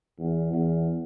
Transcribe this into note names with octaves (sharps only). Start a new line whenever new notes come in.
E2
E2